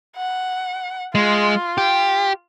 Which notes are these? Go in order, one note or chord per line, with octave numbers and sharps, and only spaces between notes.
F#5
G#3 F4
G4